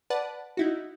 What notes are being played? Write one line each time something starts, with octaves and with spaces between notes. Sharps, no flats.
B4 D5 F#5 A5
D#4 E4 F#4